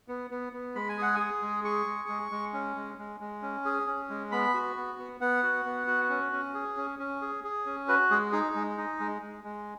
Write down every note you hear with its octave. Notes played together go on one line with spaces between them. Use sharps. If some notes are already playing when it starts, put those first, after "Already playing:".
B3
B3
B3
G#3 B5
G#5
G#4 F#5
G#4 G#5
G#3
G#4 C#6
G#3
G#3
G#3
C#4
G#3
G#3
G#3
C#4
G#4
C#4
G#3
B3 B5
F#4
B3
B3
B3 F#5
F#4
B3
F#4
C#4
C#4
G#4
C#4
C#4
G#4
G#4
C#4
F#4 B4
G#3 G#4
D#4 G#4
G#3
D#4
G#3
G#3
G#3